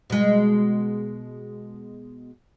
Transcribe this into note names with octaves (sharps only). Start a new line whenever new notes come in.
B2 G#3